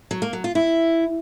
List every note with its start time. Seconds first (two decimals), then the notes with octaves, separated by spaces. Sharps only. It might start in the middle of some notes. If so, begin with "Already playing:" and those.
0.11 F#3
0.22 A#3
0.33 F#3
0.44 F4
0.55 E4